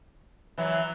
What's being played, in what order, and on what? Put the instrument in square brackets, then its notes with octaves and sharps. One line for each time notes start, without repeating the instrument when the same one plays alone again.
[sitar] E3 F#3